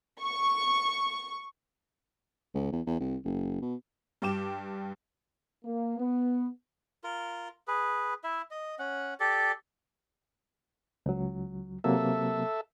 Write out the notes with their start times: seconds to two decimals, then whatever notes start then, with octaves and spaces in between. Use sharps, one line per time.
0.21 C#6
2.54 C#2
2.72 E2
2.87 E2
3.00 C2
3.25 F#1
3.62 B2
4.22 G2 G3 G5 D6 E7
5.64 A#3
5.98 B3
7.04 F4 A#4
7.67 G#4 B4
8.24 E4 E5
8.51 D#5
8.79 C#4 F#5
9.20 G4 A4 D5
11.06 C#2 F#3
11.84 C3 F#3 A#3 A4 E5